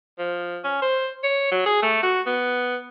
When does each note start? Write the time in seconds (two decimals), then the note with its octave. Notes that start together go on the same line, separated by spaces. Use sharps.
0.19 F3
0.64 C#4
0.82 C5
1.24 C#5
1.52 F#3
1.66 G#4
1.82 A3
2.03 F#4
2.26 B3